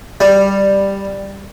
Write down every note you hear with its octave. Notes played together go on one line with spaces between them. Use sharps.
G3